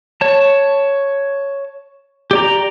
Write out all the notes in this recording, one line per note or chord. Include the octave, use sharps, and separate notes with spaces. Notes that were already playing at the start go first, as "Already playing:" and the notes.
C#5 A5
G4 D5 A#5